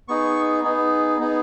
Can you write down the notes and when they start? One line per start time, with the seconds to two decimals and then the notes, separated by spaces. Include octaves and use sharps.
0.08 B3 D#4 G#4 C#6
0.64 B3 D#4 G#4
1.20 B3 D#4 G#4